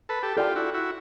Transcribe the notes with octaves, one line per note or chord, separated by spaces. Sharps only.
A4 B4
G4 A4
F4 G4 A4 D5 G5 C6
E4 F#4
E4 F#4